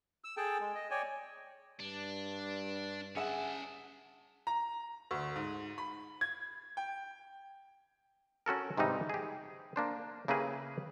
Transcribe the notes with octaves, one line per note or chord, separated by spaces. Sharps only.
E6
G#4 A4 G5 A5
G#3
D#5
C#5 D5 G5 G#5
G2 D4
C#4 G#4 E5 F#5 A5
A#5
D2
G#2
B5
G#6
G5
C#4 F#4 A4 A#4
G#2 C3 E3 G3 D#4
G4 G#4
A#3 D4 C5
C#3 A#3 E4 G4 G#4 B4